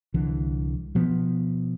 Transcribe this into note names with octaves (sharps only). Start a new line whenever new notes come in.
C2 D3 E3
B2 F3 B3